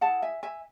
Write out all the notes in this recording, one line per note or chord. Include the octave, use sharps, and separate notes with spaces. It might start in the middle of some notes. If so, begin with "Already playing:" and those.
E4 G#4 F#5 A5
E5 G#5
E5 G#5